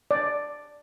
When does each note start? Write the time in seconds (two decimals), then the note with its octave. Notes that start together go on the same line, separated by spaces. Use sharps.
0.11 D5